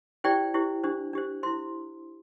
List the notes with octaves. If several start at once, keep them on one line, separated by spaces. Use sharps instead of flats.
E4 G4 C5 D5 G5
E4 G4 C5
D4 G4 C5
D4 G4 C5
E4 C5 C6